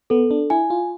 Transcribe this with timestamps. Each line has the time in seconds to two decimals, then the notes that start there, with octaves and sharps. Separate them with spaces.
0.10 B3 A4
0.31 D4
0.50 E4 G#5
0.70 F4